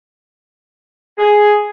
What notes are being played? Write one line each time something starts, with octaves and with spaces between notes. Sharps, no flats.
G#4